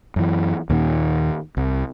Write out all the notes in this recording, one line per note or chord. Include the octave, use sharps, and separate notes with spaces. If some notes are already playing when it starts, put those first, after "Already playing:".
F#2 E3
D#2 A#2 D#3
C2